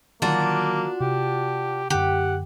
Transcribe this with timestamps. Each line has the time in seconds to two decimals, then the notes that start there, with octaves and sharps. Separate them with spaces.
0.22 D3 D#3 F#3 A#3 D4 F4 F#4
1.00 C3 G4
1.90 F#2 D3 G4 F#5